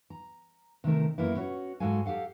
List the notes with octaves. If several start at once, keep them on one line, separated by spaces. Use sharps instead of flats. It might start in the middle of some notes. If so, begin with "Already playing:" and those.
A#5
C3 D#3 A3 A#4
F#2 A#3 B3 E4
C#4 F#4 C#5
G#2 G#3 F#4 A4 F5 G#5
G4 A4 F5 F#5